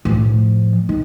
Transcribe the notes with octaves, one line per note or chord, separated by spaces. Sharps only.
A2 F3
D#3